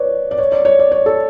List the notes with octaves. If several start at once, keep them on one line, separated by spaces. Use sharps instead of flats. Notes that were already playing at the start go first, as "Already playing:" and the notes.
Already playing: B4 C#5 D5
D5
C#5
D5
C#5
D5
C#5
A4